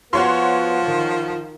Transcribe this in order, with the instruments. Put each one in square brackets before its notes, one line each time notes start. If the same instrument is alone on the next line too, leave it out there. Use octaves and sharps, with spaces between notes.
[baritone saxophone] F3 [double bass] B3 [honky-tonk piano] F#4 C#5 C6
[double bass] D#3